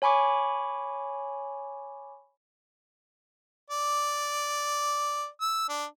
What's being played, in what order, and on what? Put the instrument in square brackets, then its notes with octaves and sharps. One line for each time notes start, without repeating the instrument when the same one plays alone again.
[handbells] C#5 G#5 B5 C#6 D6
[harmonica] D5
E6
D4